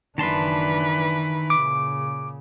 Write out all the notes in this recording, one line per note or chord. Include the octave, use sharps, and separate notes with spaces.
F#1 D#3 E3 D4 B4 A5 C6
A#2 C#3 D6